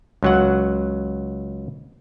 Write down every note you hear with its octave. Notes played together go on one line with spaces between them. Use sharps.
C#2 F#3 F#5